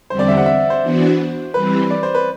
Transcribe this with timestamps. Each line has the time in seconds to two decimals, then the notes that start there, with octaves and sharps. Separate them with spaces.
0.10 E2 D3 G3 C4 C5
0.19 D5
0.28 E5
0.37 F#5
0.46 E5
0.70 C5
0.83 E3 B3 D4 F#4
1.54 E3 G3 C4 B4
1.91 D5
2.03 C5
2.15 B4